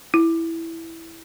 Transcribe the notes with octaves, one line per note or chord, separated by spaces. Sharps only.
E4